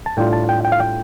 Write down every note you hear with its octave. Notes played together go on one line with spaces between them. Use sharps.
A5
A2 G3 D4 F4 G5
A5
G5
G5
F5
G5